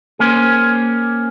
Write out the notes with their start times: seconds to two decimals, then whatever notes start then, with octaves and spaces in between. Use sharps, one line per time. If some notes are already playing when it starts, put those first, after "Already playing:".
0.19 A#3 C#4 G#4 C5